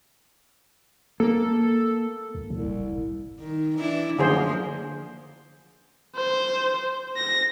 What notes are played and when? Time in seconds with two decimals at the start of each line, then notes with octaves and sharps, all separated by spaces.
1.20 A#3 A4
2.35 C#2
2.50 C2 A2
2.62 F1
2.92 F1
3.40 D#3
3.77 E3 D4 E4
4.19 F#2 D3 F3 A#3 G#4 C5
6.16 C5
7.17 A#6